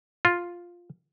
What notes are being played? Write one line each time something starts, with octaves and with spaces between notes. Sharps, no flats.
F4